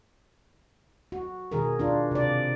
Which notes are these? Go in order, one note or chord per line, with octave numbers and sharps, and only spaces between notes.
F#4
B2 D#3 G#4 A#4
D4 F4
C3 D5